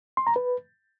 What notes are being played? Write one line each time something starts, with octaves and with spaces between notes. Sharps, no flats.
C6
A#5
B4